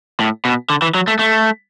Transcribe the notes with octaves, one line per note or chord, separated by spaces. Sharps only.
A2
B2
D3
E3
F#3
A3
A3